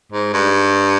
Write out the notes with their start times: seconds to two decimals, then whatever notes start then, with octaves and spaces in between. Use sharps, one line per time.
0.12 G#2
0.33 G2